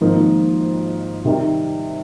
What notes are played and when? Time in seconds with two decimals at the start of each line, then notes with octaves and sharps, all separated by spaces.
0.01 G#1 G#2 F3 A#3
1.25 C3 D#3 G3